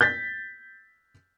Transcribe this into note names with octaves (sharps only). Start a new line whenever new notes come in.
G6 A6 B6